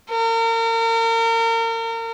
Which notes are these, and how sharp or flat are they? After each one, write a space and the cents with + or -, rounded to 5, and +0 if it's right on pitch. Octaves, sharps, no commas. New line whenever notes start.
A#4 -35